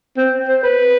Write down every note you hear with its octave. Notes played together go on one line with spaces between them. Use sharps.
C4
C5
B4